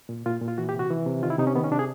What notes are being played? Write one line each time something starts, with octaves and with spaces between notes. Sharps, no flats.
A#2
A#2 F4
A#2
F4
E3 F#4
G4
C3
F#4
E3
C3
D#3 F4
E4
C3 D#4
C#4
D#3 B3
C#4
C3 D4
G#4